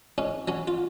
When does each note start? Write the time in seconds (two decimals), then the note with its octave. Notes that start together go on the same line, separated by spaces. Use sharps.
0.18 G#2 C#4
0.48 F#3 C#4
0.68 F4